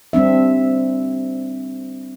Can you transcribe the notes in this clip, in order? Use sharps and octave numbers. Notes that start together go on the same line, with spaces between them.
G3 C4 D4 E5